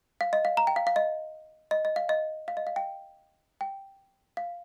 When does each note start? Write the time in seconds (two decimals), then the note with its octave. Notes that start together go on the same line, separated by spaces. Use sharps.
0.21 F5
0.33 D#5
0.45 F5
0.57 A#5
0.67 G5
0.76 F5
0.87 F5
0.96 D#5
1.71 D#5
1.85 D#5
1.96 F5
2.09 D#5
2.48 F5
2.57 D#5
2.67 F5
2.76 G5
3.61 G5
4.37 F5